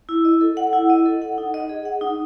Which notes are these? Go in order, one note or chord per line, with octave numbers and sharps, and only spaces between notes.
E4
D#5
A4
F#5
E4
D#5
A4
F#5
D#4
D#5
G#4
F#5
D#4